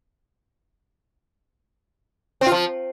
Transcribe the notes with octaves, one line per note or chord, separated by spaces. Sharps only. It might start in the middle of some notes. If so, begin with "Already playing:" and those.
C4
F4
F3